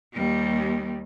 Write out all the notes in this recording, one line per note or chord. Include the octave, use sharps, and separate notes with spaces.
D#2 G3